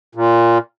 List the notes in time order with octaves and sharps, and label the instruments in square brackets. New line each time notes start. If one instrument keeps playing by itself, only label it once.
[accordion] A#2